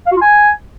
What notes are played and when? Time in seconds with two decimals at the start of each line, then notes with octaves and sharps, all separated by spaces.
0.06 F5
0.11 F#4
0.17 F4
0.22 G#5